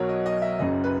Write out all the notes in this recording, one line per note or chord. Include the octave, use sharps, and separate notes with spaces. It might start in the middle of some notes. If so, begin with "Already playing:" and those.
Already playing: B1 B2 F#3 A#4 C#5
D#5
D#5
E5
F#1 F#2 C#3 D#5
B4